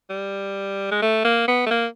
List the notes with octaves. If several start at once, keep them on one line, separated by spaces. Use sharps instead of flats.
G3
G#3
A3
A#3
B3
A3
A#3